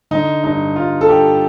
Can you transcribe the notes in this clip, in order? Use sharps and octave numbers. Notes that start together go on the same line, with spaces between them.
D3 D#4
G2 D#4
G2 F4
A4
G2 G4